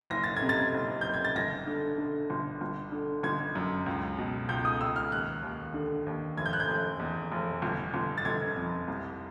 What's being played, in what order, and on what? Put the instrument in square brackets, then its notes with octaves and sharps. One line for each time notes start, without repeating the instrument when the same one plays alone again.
[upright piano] F#1 A#6
A6
G#6
C3
A6
F#1
F#1 G6
G#6
A6
G1 A#6
D3
D3
G1
G1
D3
G1 G#6
F#2
C#2
B2
C#2 G6
D#6
C#2 E6
F6
D#2 F#6
D#2
D3
D#2
F1 G#6
G6
F#6
G6
F1
E2
F1
G1
G1
A6
G1 G#6
F2
C2